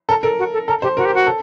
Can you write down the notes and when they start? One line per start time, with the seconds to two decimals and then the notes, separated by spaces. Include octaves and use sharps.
0.09 A4 A#4
0.23 A4 A#4
0.39 F#4
0.53 A4
0.68 A4 A#4
0.82 G4 C5
0.97 F#4 A#4
1.05 G4
1.15 F#4
1.27 A4